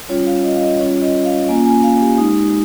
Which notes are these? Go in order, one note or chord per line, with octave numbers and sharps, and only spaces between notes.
G3 C#4 F4 C#5
F5
D#5
F5
D#5
G3 C#4 F4 C#5
D#5
F5
A#3 C#4 F4 G#5
G#5
F5
G4
G#3 D#4